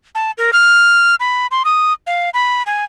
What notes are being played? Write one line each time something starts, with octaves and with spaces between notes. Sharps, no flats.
A5
A#4
F6
B5
C6
D#6
F5
B5
G#5